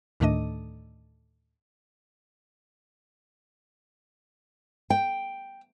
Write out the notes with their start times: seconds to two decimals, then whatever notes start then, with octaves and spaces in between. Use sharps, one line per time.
0.20 D2 A2 D#3 A3 D4 D#5
4.90 G5